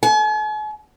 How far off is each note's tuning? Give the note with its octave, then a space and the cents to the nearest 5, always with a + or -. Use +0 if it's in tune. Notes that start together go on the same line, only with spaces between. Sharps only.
G#5 +45